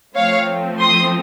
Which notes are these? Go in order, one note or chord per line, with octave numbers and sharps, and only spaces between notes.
F3 A3 C4 C#5 F5
C6 D#6